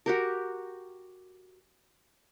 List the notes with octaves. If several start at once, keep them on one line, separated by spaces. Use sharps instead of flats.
F#4 G4 A#4